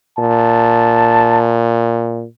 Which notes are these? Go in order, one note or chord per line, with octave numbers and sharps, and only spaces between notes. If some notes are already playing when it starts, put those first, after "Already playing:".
A#2 A5